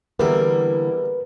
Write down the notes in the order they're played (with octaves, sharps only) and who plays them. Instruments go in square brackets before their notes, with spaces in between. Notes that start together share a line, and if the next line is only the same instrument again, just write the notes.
[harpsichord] E2 G3 E5 [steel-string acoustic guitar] D3 E3 A#3 [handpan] A#4 [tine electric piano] B4